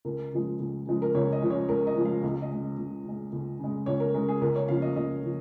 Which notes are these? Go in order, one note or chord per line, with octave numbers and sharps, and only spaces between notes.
C#2 A#4
C#3 F3 G#3
C#2
C#3 F3 G#3
A#4
C#2 C#5
D#5
C#3 F3 G#3
C#5
C#2 A#4
D#5
C#3 F3 G#3
F5
C#2 D#5
D#5
C#3 G#3
C#2
C#3 G#3
C#2
C#3 G#3
C#2 C#5
A#4
C#3 G#3 A#4
G#4
C#2 A#4
C#5
C#3 F3 A#3 F5
D#5
C#2 D#5
C#3 F3